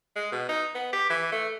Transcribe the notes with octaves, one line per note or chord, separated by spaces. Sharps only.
G#3
B2
D#4
B3
G4
E3
A3